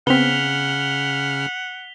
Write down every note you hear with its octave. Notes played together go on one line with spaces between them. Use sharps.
C#3 B3 C4 F#5 F6 B6 F7 G7